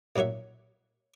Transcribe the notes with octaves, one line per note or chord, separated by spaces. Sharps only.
B1 A#2 F#3 F#4 E5